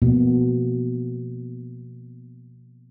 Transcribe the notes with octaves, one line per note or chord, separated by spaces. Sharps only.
B2 F3 A#3 B3